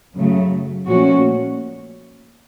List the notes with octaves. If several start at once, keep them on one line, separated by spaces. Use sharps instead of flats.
F#2 C#3 F#3 A3
A#2 F3 A3 C#4 F#4